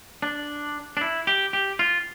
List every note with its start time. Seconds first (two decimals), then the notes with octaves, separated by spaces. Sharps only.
0.22 D4
0.97 D4
1.01 E4
1.27 G4
1.53 G4
1.79 F4